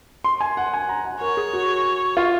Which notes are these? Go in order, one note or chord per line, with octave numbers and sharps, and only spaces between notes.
C6
G#5
F#5
G#5
A#5
F#5
A#4 C#5
G#4
F#4
F4